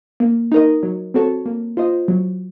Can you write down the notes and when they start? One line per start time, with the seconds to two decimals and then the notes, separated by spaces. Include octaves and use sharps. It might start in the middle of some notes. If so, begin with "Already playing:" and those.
0.20 A#3
0.52 D#4 A#4 D#5
0.83 F#3
1.14 C4 F#4 A4 C#5
1.46 A#3
1.77 F4 C5 D#5
2.08 F#3